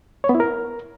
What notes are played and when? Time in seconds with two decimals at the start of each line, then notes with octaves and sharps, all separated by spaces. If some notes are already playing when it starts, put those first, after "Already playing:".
0.24 C#5
0.29 B3
0.35 E4
0.40 A#4